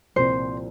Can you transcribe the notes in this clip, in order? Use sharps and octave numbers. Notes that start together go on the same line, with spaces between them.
C2 A#2 F3 C4 C5